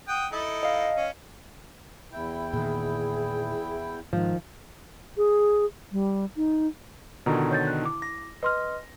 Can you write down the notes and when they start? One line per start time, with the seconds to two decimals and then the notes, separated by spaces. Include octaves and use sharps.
0.08 F#5 G5 D#6
0.32 D#4 E4 A4
0.63 D#5 F5
0.97 C#4
2.12 E2 E4 G5
2.53 A#2 D#3 G#4
4.13 G#2 D#3 F3
5.17 G#4
5.92 G3
6.37 D#4
7.26 B2 D3 D#3 F4 A#5
7.51 C#5 G6 A6
7.67 F#6
7.82 E4 D6
8.02 A#6
8.43 B4 D#5 C6 F6